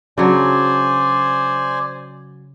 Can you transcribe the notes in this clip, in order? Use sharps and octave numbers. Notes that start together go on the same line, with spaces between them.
C#3 F#3 D4 C5 D5 G#5